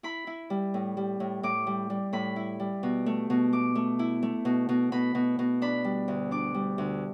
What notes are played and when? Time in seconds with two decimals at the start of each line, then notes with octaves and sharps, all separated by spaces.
0.03 E4 B5
0.27 E4
0.50 G3
0.74 A2
0.97 G3
1.20 A2
1.43 A2 D6
1.67 G3
1.90 G3
2.13 A2 B5
2.36 E4
2.60 G3
2.83 B2
3.06 A3
3.30 B2
3.52 A3 D6
3.75 A3
3.99 E4
4.23 A3
4.45 B2
4.69 B2
4.92 B2 B5
5.15 B2
5.39 B2
5.62 D4 B5
5.84 G3
6.08 D2
6.31 D4 D6
6.54 G3
6.78 D2